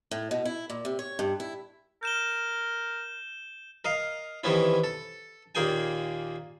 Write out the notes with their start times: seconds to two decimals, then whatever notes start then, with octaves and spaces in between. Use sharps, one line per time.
0.11 A2
0.31 B2
0.45 E4
0.70 A#2
0.85 C3
0.99 C#5
1.19 G2
1.40 E4
2.03 A#4 G6 E7 G7
3.85 A#4 D#5 F5
4.44 C3 D#3 E3 B3 C#4 E4
4.84 A4
5.55 D#2 A#2 A#3 G#4 G5 G#5